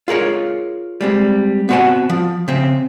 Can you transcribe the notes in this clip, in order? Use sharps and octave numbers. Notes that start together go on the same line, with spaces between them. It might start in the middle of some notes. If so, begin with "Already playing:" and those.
F4 G#4 A#4 C#5
G3 G#3 C4
B3 C4 F#4 C5 F#5 G#5
F3
C#3 C4